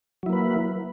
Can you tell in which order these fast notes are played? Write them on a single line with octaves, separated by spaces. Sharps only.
F#3 E4 A#3 B4